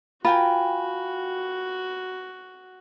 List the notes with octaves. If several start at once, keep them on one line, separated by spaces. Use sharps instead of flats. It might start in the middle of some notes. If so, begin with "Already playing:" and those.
F4 F#4 A#4 G5 G#5 B5